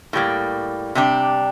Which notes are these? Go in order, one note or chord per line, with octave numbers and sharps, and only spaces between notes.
A2 G3 A#3
C3 G3 D4 G4